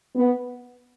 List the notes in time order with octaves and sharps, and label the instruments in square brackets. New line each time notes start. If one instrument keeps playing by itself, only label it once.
[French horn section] B3